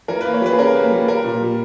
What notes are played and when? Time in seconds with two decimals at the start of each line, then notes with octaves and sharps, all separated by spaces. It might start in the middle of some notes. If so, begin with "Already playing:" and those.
0.08 E3 A#4
0.21 B4
0.25 A#3
0.33 C#5
0.42 G3 B4
0.53 G#4
0.59 C#4 A#4
0.75 A#3
0.91 G3
1.08 G3 A#4
1.24 A#2
1.41 G3